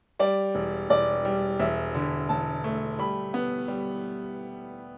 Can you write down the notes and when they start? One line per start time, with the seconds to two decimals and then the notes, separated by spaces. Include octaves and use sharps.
0.19 G3 D5
0.55 E1
0.90 E1 D5
1.25 G3
1.59 E1 E5
1.95 D3
2.29 E1 A5
2.64 A3
2.99 G3 B5
3.34 B3
3.68 G3